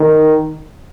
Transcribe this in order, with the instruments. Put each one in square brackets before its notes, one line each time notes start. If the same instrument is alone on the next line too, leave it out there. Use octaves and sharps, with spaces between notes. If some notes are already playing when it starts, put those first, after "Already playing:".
Already playing: [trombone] D#3